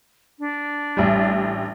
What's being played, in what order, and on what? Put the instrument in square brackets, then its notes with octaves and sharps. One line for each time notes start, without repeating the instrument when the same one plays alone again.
[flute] D4
[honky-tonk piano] A1 G3